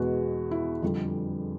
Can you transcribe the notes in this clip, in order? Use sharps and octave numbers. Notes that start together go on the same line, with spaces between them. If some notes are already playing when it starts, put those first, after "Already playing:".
Already playing: E2 B2 G#3 F#4
E4
F2 D3 G3